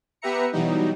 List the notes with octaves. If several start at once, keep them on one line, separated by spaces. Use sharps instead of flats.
B3 G4 B4 E5 A#5 C#7
B2 E3 F#3 G3 D#4